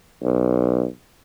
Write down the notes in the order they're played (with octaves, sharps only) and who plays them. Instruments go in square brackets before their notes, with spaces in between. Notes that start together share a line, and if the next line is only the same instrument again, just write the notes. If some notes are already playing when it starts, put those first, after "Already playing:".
[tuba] B1